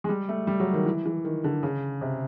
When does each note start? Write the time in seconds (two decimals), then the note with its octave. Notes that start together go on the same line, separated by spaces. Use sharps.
0.04 G#3
0.09 G3
0.29 A3
0.47 G3
0.60 F#3
0.73 D#3
0.86 E3
1.05 E3
1.25 D#3
1.44 D3
1.63 C#3
2.01 C3